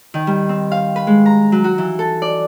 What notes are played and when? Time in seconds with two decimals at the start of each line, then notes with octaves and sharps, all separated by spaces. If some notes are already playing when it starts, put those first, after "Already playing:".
0.14 D#3
0.27 G3
0.49 C4
0.71 F5
0.96 B4
1.07 G#3
1.26 A#5
1.52 F#3
1.64 F#4
1.78 E3
1.99 A4
2.22 D5